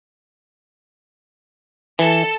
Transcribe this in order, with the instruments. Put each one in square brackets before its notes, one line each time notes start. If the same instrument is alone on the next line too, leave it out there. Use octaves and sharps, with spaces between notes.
[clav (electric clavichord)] E3 [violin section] A4